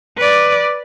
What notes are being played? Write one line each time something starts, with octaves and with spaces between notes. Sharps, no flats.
B4 D5